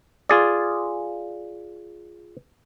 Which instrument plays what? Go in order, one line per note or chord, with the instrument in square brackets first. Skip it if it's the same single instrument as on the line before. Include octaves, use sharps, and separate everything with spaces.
[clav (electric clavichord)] F4 G#4 D5